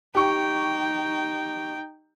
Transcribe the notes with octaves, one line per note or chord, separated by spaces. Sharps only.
D#4 G4 G5 C#6